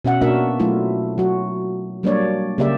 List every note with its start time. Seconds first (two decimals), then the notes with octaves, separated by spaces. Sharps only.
0.05 B2 C#4 E5 F#5
0.21 B2 A#3 D4 F#4 A#4 E5
0.60 F#3 A3 E4 F4
1.18 F#3 F#4
2.03 F#3 G3 A#3 D4 C#5 D5
2.58 C#3 A#3 G4 D5 E5